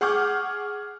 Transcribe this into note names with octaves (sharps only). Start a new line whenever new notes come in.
G#4 F#5 C#6 D6 F6 G6